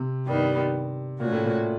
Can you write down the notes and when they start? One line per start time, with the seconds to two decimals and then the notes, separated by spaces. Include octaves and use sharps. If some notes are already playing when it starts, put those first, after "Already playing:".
Already playing: C3
0.26 G2 D#3 G3 B3
1.20 A#2 A3 C#4 F#4
1.32 A2
1.45 A#2